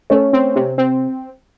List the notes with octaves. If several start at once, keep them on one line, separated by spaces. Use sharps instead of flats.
A3 C#4
C4
C3
C4